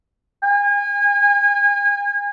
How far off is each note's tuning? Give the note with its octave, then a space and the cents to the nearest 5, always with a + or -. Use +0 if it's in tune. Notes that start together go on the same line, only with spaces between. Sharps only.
G#5 -35